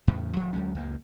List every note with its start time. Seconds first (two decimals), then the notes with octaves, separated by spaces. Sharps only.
0.07 E2 A2 C#3
0.36 D1 F3
0.53 D2 F#3 G#3 C#4
0.75 C#2 F#2 A#3